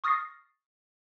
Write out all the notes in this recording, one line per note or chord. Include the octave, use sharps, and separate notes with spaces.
C#6 D#6 F6 A6 A#6 C7